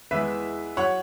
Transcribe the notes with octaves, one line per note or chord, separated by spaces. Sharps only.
E2 E3 G#3 B4 E5
F#3 C#5 F#5